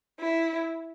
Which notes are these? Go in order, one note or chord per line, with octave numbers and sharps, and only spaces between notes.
E4